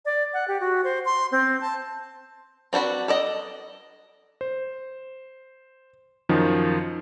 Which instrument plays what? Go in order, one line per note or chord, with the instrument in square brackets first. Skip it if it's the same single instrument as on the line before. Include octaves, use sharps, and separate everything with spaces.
[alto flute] D5
F#5
G4
F#4
C5
C6
C4
A5
[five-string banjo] C4 D4 F#4 B4
A4 D5 D#5
[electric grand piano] C5
F#2 D#3 F3